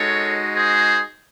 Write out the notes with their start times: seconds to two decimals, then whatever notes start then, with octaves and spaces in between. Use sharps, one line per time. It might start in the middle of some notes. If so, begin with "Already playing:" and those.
Already playing: G#3 D#4 F#4 A4 C#5
0.55 G#4 C5